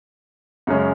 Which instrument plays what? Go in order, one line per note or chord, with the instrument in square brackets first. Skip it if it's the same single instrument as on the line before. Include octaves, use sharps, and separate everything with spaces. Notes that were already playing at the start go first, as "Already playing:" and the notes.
[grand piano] F#2 C#3 G#3 C#4